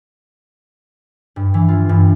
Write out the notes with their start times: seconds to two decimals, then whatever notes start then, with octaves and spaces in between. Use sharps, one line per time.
1.36 G2
1.54 E3
1.69 F4
1.89 G2